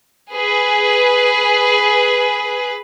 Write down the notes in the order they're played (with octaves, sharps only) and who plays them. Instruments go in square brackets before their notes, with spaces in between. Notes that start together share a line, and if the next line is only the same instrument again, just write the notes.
[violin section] G#4 B4